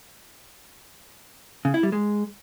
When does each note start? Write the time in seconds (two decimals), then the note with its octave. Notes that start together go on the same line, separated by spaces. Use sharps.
1.65 C#3
1.74 E4
1.83 G3
1.92 G#3